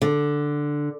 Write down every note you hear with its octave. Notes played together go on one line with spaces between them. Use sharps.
D3